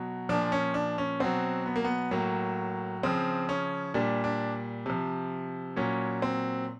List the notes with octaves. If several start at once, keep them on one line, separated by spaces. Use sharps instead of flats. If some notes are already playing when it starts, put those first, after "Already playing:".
Already playing: B2 F#3
A#2 F3 D4
C#4
D4
C#4
B2 F#3 C4
B3
A#3
B3
A2 F#3 A#3
C#3 F3 C4
C#4
A#2 G3 D4
D4
C3 F3
A#2 F#3 C#4
C4